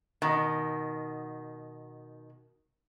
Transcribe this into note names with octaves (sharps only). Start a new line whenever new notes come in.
B2 D#3